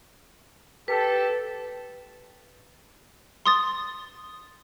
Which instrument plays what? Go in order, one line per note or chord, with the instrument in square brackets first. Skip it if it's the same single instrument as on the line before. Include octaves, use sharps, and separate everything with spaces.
[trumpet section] G4 A4 [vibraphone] B4
[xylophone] C6 D#6 A6